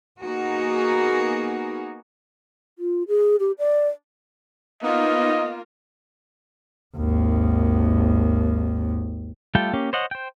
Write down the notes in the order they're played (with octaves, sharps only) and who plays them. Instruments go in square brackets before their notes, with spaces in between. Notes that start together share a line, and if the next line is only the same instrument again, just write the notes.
[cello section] A#3 B3 D#4 F#4 G#4 A#4
[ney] F4
G#4
G4
D5
[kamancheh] A#3 F4 [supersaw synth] B3 D#4 [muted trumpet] D#5
[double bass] G#1 D#2
[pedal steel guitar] G3 A3 F4 A4 G5
A#3 C#4 G4
C5 C#5 D#5 F#5
C5 G5